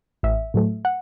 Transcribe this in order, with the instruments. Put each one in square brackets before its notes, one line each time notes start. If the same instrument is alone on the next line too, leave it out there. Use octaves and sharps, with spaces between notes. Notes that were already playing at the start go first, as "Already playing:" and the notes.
[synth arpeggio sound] A1 E5
A2 F#3 A3
F#5